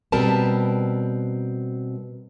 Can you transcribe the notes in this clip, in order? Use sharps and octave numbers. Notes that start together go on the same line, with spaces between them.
B2 G3 C4 A#4 B4 A5